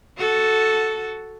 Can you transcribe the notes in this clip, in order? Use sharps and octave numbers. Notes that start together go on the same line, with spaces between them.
F#4 A4